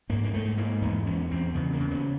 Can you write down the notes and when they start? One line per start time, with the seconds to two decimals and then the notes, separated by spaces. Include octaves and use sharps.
0.09 G#2 A#3
0.24 A#3
0.33 G#2 A3
0.58 G#2 A#3
0.82 E2 B3
1.06 E2 C#4
1.31 E2 C4
1.55 C#3 B3
1.73 A#3
1.80 C#3
1.91 B3